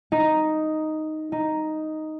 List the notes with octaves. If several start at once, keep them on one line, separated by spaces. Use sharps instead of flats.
D#4
D#4